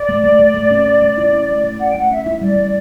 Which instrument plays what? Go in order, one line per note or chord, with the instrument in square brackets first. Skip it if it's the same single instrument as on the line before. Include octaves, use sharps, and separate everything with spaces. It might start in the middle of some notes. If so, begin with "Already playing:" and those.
Already playing: [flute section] D5
[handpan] A3
A3
A3
A3
C#4
C#4
A3
E4
C#4
A3
A3
[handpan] C#4 [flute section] F#5
[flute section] G5
[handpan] A3 [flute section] F#5
[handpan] C#4 [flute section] E5
[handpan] E4
[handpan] G3 [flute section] D5
[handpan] G3